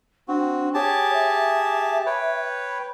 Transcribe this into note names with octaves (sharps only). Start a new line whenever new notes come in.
C4 D4 F#4
G4 G#4 C#5 A5
E5
B4 C#5 G5